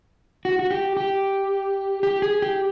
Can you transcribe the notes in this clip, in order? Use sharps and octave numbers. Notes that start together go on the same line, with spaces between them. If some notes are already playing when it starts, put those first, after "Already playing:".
F#4
F#4
G4
G4
G4
G#4
G4